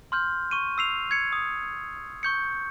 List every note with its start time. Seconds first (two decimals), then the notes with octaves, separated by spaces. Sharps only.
0.12 C6 F6 G6
0.51 C#6 D#7
0.78 E6 C7 F7
1.11 G#6 C#7
1.33 D#6
2.23 C#6 G6 C#7